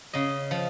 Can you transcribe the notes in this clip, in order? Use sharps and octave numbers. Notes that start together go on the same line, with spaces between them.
C#3 D#5
F3